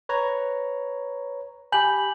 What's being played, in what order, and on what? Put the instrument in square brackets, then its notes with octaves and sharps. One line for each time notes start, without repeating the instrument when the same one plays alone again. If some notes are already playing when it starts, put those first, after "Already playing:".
[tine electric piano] B4 C#5 A#5
[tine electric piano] G4 B5 [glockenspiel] G#5 G6 F#7